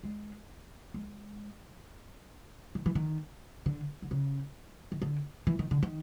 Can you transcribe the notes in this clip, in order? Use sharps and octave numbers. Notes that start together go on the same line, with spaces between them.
G#3
G#3
D#3
E3
D#3
D3
D3
C#3
D#3
D3
E3
D#3
D3
D#3